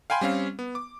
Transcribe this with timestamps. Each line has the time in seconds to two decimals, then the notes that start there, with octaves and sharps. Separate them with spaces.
0.10 F5 G5 G#5 B5 C6
0.21 G3 C4 C#4 F5
0.59 B3
0.75 D6